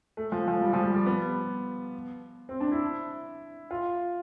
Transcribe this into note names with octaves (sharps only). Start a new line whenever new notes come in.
A3
F3
F3
G3
F3
G3
G3
B3
C4
D4
E4
F4